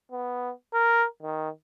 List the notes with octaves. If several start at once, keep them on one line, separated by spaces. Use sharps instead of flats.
B3
A#4
D#3